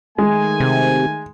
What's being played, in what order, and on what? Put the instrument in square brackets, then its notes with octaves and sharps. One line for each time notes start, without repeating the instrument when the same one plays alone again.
[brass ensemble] D#3 A3 G#5 [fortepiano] G#3
[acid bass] C3